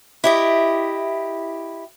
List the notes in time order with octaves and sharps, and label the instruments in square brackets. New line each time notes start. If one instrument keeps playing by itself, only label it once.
[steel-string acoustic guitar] E4 G4 D#5